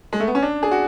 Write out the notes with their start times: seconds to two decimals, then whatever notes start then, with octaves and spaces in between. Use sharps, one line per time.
0.13 G#3
0.20 A3
0.27 B3
0.35 C#4
0.42 D4
0.63 G#4
0.71 F#4